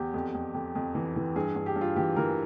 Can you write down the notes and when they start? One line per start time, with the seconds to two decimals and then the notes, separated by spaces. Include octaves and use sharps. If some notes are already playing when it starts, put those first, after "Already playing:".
Already playing: E2 G4
0.14 F2
0.34 F2
0.54 F2
0.75 F2
0.95 E3
1.16 E3
1.36 G2 G#4
1.56 G2
1.66 G4
1.76 G2
1.81 F4
1.96 E3 G4
2.16 E3 A#4